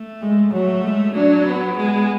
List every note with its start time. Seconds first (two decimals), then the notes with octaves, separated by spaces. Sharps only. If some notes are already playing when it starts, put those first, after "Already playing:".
Already playing: A3
0.22 G#3
0.53 F#3 A3
0.83 G#3
1.14 F#3 D4
1.46 B3
1.77 G#3